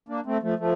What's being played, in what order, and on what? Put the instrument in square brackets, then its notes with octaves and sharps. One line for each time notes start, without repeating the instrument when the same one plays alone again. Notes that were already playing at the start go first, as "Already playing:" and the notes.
[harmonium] A#3 D4
A3 C4
F3 A3
F3 A3